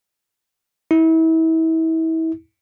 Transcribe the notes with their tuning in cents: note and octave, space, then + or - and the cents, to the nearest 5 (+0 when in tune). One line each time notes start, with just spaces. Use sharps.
E4 -35